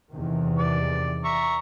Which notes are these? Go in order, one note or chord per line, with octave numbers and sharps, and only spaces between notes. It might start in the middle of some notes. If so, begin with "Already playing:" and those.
E2 C3 D#3
D5
E5 A#5 C#6